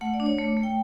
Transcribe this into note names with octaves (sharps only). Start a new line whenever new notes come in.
A3 F#5
D5
D4
C#5
A3 C#5
A3
G5